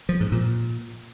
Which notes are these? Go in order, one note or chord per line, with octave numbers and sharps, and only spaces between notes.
F3
G#2
A#2